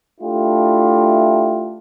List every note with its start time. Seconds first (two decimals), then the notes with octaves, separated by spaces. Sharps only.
0.21 A3 D4 E4 F4 G4